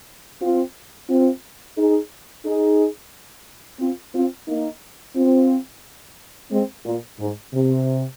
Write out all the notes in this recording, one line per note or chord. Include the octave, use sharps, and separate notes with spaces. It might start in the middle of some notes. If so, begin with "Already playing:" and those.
C4 F4
C4 F4
D#4 G#4
D#4 G#4
C4 F4
C4 F4
A#3 D#4
C4 F4
G#3 C4
A#2
G#2
C3